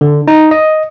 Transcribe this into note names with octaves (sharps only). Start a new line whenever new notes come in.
D3
D#4
D#5